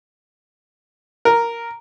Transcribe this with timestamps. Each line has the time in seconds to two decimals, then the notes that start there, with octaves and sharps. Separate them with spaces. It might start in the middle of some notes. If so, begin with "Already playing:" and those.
1.25 A#4